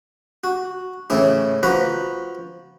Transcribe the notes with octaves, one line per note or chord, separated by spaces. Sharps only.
F#4
A2 C#3 E3 E4
F3 F#4 B4 A#5 B5